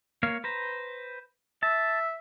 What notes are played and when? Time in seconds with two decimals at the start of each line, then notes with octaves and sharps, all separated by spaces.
0.23 A#3 C#5 F5
0.44 B4 C5 A#5
1.63 E5 A5